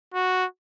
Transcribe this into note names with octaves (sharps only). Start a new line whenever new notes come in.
F#4